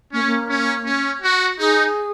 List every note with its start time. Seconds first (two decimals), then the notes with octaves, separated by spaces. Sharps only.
0.12 A#3 C#4
0.26 A#3
0.49 C#4
0.85 C#4
1.22 F#4
1.59 D#4 G#4